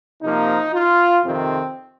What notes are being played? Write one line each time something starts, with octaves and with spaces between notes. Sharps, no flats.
C3 F3 A#3 D#4
F4
F2 C3 D#3 C4